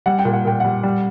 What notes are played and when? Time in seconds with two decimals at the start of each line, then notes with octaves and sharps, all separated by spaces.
0.06 G3 F#5
0.19 G5
0.25 A#2
0.33 F#5
0.45 A#2 G5
0.60 G3 F#5
0.83 G3